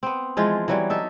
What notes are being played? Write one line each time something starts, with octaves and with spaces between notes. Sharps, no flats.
B3 C4
E3 F3 G#3 F4
E3 F#3 G3
D#4 A4 E5